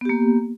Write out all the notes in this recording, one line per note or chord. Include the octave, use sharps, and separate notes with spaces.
A#3 B3 G4